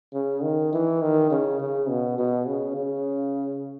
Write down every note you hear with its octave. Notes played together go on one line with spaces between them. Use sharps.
C#3
D#3
E3
D#3
C#3
C#3
B2
B2
C#3
C#3